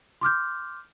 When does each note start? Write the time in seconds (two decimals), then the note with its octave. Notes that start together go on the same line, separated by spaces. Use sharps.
0.21 C6 D6 F6 G6